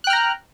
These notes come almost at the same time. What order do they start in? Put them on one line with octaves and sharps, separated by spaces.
F#6 G5 F6 A#5